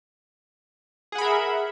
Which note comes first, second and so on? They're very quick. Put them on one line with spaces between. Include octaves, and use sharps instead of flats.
G#4 F#5 B5 A#4 E5